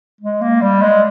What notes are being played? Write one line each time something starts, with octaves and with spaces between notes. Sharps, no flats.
G#3
A#3
G3
G#3